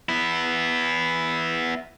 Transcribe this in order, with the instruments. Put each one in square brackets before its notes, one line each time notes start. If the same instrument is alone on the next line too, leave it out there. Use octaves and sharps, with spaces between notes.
[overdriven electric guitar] B3 E4